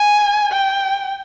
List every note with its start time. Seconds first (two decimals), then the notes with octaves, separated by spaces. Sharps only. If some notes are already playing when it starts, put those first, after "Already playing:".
Already playing: G#5
0.52 G5